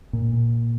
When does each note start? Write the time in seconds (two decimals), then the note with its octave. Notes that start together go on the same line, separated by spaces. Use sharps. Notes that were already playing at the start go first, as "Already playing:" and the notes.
0.13 A#2